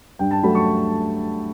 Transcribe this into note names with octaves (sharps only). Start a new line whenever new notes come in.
G2 G5
A5
F#3 A3 B5
C#6